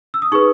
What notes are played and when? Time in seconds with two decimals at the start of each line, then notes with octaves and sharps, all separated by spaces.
0.14 E6
0.22 D#6
0.32 D#4 G#4 B4 C#6